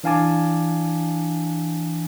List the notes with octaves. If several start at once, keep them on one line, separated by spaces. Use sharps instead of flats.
E3 D4 F5 G#5 A5 D6